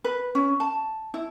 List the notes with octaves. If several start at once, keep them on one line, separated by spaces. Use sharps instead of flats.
B4
C#4
A5
E4